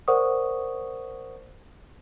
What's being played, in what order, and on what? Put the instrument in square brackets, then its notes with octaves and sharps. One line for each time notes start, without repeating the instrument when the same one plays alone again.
[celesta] A#4 C5 D5 F#5 C#6 D#6